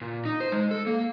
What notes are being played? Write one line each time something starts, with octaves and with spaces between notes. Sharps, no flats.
A#2
D#4
C5
G#3
A4
A#3